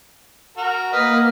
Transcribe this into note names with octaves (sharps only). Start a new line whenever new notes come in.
F#4 A#4
A#3 B4 D#5 F#5 F6